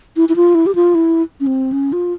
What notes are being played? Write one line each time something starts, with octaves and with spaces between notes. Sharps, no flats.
E4
E4
F4
E4
G4
F4
E4
C#4
C4
C#4
F4